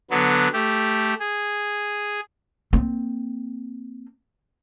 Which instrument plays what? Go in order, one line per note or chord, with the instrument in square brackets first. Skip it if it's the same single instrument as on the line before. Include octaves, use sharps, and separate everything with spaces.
[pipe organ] D3 F#3 B3
A3 G4
G#4
[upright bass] A#3 C4